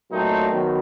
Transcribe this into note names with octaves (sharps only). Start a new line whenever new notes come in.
A#2 F#3 A3 C4 D#4
D#3 F#3 B3